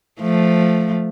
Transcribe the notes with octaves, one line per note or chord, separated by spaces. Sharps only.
F3 A3